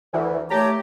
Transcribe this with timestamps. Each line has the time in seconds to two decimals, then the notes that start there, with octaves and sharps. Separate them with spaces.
0.13 D2 E3
0.51 D#2 A3 G4 C#5 A5 A#5